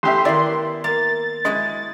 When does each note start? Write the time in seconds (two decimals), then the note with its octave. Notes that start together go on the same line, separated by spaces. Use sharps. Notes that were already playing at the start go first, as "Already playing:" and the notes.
0.03 A1 G4 E5 C6
0.25 D#3 B3 E4 D5
0.84 A#3 A6
1.45 G#3 E4 F#4 D#5